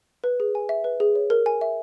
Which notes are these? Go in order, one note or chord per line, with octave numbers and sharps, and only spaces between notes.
B4
G#4
G#5
E5
B4
G#4
C#5
A#4
G#5
E5